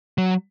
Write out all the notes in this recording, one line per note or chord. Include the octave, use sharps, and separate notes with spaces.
F#3